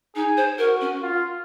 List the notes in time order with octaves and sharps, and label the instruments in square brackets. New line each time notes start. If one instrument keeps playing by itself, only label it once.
[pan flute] D#4 [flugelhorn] G#4
[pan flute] C5
[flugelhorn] F#4 [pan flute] A#4
[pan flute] C#4
[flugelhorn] F4